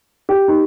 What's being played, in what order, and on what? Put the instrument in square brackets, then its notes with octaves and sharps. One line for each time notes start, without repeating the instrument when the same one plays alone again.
[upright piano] G4
D#4